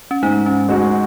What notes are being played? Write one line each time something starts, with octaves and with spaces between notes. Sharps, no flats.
C#4
G#2 D#4
C#4
G#3 D#4 F#4